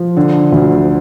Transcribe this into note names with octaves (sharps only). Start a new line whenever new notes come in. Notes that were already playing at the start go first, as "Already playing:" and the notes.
Already playing: F3
D3
D2